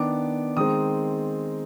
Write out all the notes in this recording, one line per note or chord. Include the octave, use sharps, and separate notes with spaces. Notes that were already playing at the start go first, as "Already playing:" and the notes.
Already playing: D#3 B3 D4 D6
D#3 G#3 C4 D#6